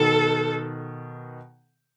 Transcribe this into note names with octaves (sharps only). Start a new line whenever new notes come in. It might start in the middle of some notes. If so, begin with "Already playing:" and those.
Already playing: B2 D#3 A4